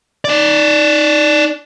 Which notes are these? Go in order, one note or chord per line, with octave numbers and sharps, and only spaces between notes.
D#4 D5